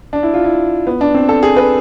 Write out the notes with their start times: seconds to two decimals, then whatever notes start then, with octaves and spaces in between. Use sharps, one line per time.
0.13 D4
0.23 E4
0.34 F4
0.44 E4
0.87 B3
1.01 D4
1.14 C4
1.29 A4
1.43 G#4
1.56 B4